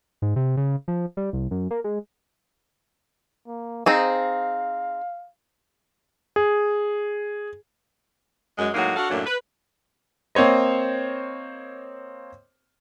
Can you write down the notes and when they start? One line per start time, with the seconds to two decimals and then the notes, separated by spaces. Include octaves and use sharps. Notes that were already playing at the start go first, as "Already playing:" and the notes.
0.22 G#2
0.36 C3
0.57 C#3
0.88 F3
1.17 G3
1.33 C2
1.51 F#2
1.71 A#3
1.84 G#3
3.47 A#3
3.86 C4 D#4 G#4 F5
6.36 G#4
8.58 F#2 G#3
8.74 A2 F#3 G#3 A#3 D#4 F#4
8.96 D4 F#4 A4 F5
9.10 F#2 A2 F#3 A3 A#3 D4
9.26 B4
10.35 A#3 C4 C5 C#5 D#5